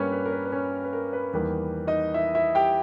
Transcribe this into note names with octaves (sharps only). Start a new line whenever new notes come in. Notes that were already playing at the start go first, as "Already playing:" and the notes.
Already playing: G2 G3 A#3 C#4 B4 C#5
B4
A#4
B4
B4
C#4 C#5
B4
A#4
B4
E2 D#3 G3 A#3 B4
D#4 D#5
E4 E5
E4 E5
G4 G5